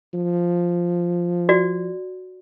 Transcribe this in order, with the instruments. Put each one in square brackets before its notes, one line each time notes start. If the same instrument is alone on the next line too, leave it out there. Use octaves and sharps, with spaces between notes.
[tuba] F3
[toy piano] F#4 D5